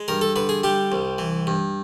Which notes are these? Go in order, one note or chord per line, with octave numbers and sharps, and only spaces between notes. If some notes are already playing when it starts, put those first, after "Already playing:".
Already playing: G#3
G2 A#4
A4
D3 B4
G#4
G3 G4
C2
E3
G2